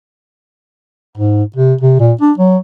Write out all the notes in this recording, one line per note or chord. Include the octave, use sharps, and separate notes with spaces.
G#2
C3
C3
A#2
D4
F#3